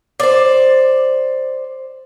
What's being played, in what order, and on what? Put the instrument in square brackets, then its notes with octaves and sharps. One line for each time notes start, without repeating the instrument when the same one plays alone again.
[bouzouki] C5 D5